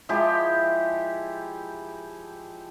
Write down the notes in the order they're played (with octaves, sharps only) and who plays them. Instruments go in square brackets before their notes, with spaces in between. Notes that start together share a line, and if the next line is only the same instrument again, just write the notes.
[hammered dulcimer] F3 G#3 E4 G4